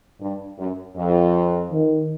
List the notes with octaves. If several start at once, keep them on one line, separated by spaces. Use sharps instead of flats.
G2
F#2
F2
D#3